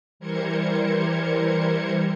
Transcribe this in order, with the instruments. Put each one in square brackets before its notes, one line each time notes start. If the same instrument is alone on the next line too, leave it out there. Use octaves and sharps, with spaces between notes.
[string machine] E3 G3 A#4 C5 G#6 C#7